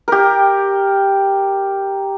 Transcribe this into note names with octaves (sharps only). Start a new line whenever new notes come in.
G4 A#4